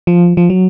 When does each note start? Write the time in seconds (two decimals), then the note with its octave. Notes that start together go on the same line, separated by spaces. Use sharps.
0.07 F3
0.37 F3
0.50 F#3